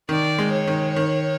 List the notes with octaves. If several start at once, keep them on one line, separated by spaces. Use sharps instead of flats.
D#3 D5
G#3
C#5
D#3
D#3